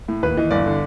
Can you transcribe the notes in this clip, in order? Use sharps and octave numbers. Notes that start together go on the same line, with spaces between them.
A2
D#2 B4
E3 D#5
G1 D5
D3